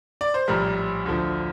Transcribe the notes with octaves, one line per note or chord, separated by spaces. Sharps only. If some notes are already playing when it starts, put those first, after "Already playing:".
D5
C5
A#1 A2 G3 A#4
D2 D3 F3